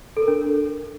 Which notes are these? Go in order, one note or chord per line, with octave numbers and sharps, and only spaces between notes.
A4
A#4
D4